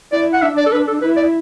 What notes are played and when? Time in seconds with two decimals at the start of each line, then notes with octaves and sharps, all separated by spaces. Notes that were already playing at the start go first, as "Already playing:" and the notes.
0.12 E4 D5
0.33 F#5
0.42 D4 E5
0.57 D5
0.66 A4
0.72 B4
0.87 A4
1.02 E4 B4
1.16 D5